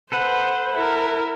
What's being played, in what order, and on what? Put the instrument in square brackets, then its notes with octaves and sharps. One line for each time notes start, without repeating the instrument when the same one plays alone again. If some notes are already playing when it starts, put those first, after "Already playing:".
[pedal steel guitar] A4 B4 F#5 [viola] C5
[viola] E4 A#4